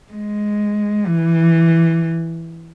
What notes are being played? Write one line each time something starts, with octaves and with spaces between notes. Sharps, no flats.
G#3
E3